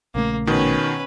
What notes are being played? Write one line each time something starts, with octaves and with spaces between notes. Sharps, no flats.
A#1 C#3 A3 A#3
B2 D#3 C#4 B4